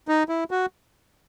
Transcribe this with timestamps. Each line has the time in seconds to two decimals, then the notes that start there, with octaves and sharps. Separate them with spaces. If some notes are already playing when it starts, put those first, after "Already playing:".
0.08 D#4
0.29 E4
0.51 F#4